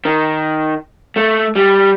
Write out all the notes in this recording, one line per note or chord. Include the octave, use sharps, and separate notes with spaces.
D#3
A3
G3